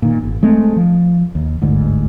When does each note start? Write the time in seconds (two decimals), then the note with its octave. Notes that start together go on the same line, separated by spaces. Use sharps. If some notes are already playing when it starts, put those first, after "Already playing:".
0.02 A#2 D#3
0.23 G#1
0.43 G#3 A3 C4
0.77 F3
1.35 D#2
1.62 G1 D2 G#2